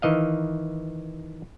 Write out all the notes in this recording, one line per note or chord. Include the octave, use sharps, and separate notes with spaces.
D#3 E3 D#5 F5